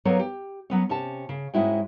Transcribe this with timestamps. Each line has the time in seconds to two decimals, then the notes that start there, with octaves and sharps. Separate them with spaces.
0.05 F#3 A#3 B3 D#4 A4 C#5
0.19 G4
0.70 F#3 B3 C#4
0.89 C3 C#4 G4 A5
1.29 C#3
1.54 G#2 G#3 C#4 E4 F#4 G5